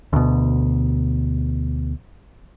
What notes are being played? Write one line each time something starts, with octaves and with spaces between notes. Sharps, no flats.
D2 B2